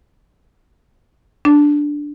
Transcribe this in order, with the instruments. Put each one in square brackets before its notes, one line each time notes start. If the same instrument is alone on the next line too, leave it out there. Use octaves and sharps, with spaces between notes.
[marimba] D4